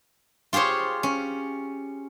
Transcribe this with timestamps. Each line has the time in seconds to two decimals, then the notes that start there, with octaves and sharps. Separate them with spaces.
0.53 F4 G4 G#4 C5 C#5
1.03 C#4